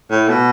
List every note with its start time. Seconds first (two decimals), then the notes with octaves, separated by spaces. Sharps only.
0.11 A2
0.29 B2